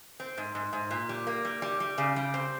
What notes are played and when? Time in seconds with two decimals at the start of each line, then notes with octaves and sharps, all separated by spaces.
0.20 C4
0.37 G#2
0.55 G#2
0.73 G#2
0.91 A#2
1.09 G3
1.27 A#3
1.45 G3
1.62 G3
1.80 G3
1.98 C#3
2.16 G3
2.34 C4